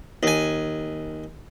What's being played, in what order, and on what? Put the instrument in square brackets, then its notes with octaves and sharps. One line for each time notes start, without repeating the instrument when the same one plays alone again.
[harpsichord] D#2 G#5